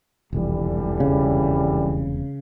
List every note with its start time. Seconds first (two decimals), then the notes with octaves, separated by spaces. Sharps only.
0.33 E1 C2 F2 D3 E3 G3
1.00 C#3